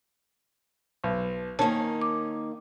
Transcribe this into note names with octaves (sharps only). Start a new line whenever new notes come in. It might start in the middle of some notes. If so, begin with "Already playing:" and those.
B1
D#3 A#3 C#4 A5
D6